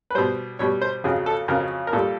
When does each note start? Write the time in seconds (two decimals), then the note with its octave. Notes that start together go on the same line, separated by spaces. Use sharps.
0.10 B4
0.15 B2 G3 C5
0.59 B2 G3 C#5
0.81 C5
1.04 F2 C#3 F#3 G#4
1.26 A4
1.48 F2 C#3 F#3 A#4
1.87 A#4
1.93 A#2 G3 A4